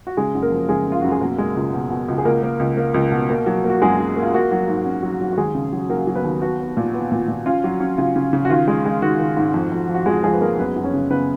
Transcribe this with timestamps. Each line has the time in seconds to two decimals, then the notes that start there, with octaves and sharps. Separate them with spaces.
0.07 F#4
0.17 C#3 G#3 G#4
0.35 F#2
0.42 A#3 A#4
0.52 F3
0.69 C#3 G#3 G#4
0.87 C#3
0.92 F4
1.01 F#2 F#4
1.12 G#4
1.21 B2 A#3 A#4
1.38 G#3
1.56 C#2
1.74 B2
1.90 B2
2.08 C#2
2.18 G#4
2.25 C#2 A#3 A#4
2.43 A#3
2.60 C#2
2.77 A#3
2.94 C#2
3.12 B2
3.30 A#3
3.46 F#3
3.64 A#3
3.70 F#4
3.82 F#2 G#3 G#4
3.98 F#3
4.16 A#3
4.22 F4
4.34 A#3 F#4
4.51 F#3
4.68 G#2
4.85 C#4
5.03 F#3
5.21 F#3
5.33 F#4
5.37 D#2 G#3 G#4
5.54 C#3
5.72 F#3
5.89 F#3 A#3 A#4
6.07 F#3
6.15 B3 B4
6.24 D#2
6.41 B3 F#4
6.60 B3
6.77 A#2
6.94 B3
7.12 A#2
7.28 A#2
7.46 C#4 F4
7.64 F#3
7.80 C#4
7.98 C#3 F4
8.16 C#3
8.33 C#3
8.45 F#4
8.50 D#3 F4
8.68 G#3
8.85 G#3
9.02 D#3 F#4
9.20 D#3
9.37 G#2
9.54 F2
9.72 F2
9.89 F3
9.94 F#4
10.06 F2 G#3 G#4
10.24 F3 G#3 G#4
10.34 B4
10.41 G#3 A#3 A#4
10.58 F#2 B3 B4
10.76 F#2
10.84 C#4 C#5
10.94 C#3
11.10 C#3 B3 B4